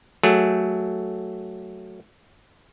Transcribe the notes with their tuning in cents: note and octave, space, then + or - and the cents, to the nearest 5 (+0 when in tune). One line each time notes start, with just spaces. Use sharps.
F#3 +5 A3 +0 G#4 +0